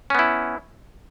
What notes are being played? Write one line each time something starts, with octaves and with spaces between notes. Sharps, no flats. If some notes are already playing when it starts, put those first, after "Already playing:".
B3 C#4 E4